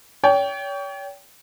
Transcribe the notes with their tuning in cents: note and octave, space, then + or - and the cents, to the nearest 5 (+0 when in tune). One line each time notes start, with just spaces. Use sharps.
C#5 +40 G5 +0